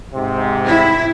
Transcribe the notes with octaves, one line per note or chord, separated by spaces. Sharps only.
G#2 C3
E4